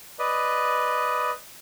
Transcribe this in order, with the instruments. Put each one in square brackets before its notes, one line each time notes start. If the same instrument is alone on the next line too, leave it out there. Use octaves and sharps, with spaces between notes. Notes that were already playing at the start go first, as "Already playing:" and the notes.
[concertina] B4 D5 D#5